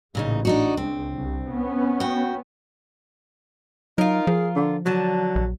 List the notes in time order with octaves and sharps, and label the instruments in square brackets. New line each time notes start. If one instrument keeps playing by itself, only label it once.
[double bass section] A1 [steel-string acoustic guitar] A#2 C#3 D#4
[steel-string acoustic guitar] D4 D#4 F#4
[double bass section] C#2 [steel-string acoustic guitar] C4
[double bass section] C2
B3 C#4
[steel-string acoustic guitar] F#4 G5
[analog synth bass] F#3 [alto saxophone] D#4 [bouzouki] F4 A#4
[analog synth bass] F3 [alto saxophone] G#4
[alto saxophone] D3
[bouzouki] D3 A5 [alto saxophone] F#3
[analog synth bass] A#1